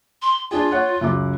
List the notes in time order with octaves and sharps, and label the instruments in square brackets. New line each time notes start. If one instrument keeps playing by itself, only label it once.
[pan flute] C6
[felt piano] D4 G#4 [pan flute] F4
[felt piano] C#5 F#5 F#6
C#2 F#2 D6